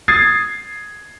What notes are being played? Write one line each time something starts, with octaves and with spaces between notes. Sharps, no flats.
D#6 G#6 A6 C7